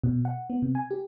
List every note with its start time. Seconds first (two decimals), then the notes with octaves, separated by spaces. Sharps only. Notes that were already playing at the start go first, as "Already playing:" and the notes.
0.04 B2
0.25 F#5
0.50 B3
0.62 C3
0.75 G#5
0.91 G4